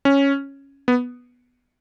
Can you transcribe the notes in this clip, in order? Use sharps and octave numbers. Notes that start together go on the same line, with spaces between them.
C#4
B3